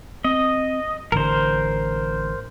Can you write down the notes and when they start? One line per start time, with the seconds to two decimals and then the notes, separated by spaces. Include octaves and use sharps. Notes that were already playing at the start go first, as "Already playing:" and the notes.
0.24 C4 D#5
1.12 A1 D3 A#4 C5